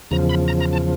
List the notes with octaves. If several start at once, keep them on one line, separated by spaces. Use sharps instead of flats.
E2 C#3 F3 A#5
B5
A#5
A#5
A5